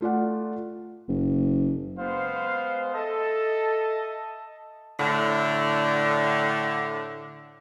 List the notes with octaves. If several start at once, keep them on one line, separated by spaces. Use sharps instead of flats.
A3 F4 D5 F#5
F#1
G#3 B3 C5 F5
A4 D#5 E5 A5
A2 D3